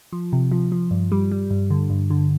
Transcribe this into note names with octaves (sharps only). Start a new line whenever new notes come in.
F3
C3
F3
F3
G2
G3
G3
G2
D3
G2
D3